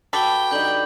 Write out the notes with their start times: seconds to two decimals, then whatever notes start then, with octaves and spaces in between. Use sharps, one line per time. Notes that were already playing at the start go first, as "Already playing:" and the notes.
0.13 F#4 A4 B4 G5 B5 D6 B6
0.51 D3 G3 D#4 G6 F#7